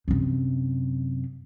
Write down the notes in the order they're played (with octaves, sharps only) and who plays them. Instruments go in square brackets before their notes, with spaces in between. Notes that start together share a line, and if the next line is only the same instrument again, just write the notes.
[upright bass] F#2 C3